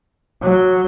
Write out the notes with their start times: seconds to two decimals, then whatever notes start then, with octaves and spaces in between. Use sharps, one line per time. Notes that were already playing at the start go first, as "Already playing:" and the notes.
0.43 F#3